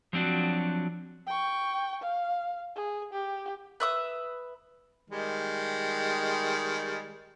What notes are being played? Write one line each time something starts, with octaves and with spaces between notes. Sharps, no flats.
F3 F#3 C4 D4 F#4
G5 C#6
F5
G#4
G4
B4 E5 D#6
D#3 G3 G#3